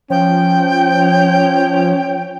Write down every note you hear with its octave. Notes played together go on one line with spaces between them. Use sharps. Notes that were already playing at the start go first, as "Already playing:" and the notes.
F3 C#4 G5